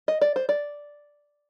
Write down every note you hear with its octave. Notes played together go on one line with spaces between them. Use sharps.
D#5
D5
C5
D5